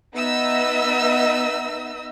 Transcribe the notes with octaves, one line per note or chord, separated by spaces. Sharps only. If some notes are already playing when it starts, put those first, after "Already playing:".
B3 D#4 D#5 E5 E6